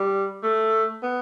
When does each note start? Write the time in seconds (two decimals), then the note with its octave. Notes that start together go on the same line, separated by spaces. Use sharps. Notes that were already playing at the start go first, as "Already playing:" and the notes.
Already playing: G3
0.43 A3
1.03 B3